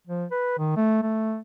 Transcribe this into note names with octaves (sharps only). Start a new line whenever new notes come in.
F3
B4
D#3
A3
A3